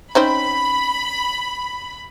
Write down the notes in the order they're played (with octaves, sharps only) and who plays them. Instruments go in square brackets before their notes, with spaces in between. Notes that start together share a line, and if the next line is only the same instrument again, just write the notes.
[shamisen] C4 C#4 D#4 [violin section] B5